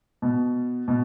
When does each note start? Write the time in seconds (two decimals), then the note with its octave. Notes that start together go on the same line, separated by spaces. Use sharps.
0.22 B2
0.88 B2